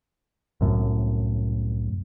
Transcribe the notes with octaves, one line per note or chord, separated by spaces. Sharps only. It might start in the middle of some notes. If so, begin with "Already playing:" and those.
C2 F#2 A2